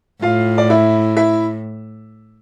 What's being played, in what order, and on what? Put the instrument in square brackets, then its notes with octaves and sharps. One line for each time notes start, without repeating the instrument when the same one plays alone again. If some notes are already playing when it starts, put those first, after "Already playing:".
[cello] A2 [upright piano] F4 F5
[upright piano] D5
E4 E5
E4 E5